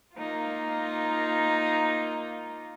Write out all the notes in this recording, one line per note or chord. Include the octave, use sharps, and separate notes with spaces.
A#3 D#4 F4